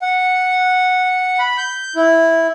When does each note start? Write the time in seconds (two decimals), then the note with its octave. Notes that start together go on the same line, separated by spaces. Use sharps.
0.02 F#5
1.39 B5
1.58 G6
1.96 E4